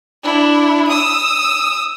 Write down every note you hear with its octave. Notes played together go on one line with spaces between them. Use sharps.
D4 E4
D#6 E6